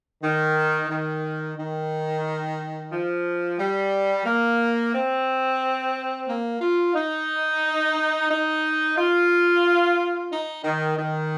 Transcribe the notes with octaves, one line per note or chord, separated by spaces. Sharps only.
D#3
D#3
D#3
F3
G3
A#3
C4
A#3
F4
D#4
D#4
F4
D#4
D#3
D#3